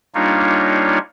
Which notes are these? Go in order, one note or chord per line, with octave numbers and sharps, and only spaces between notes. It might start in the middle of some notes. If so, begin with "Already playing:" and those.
G3 A#3 D4 D#4 F4 C#5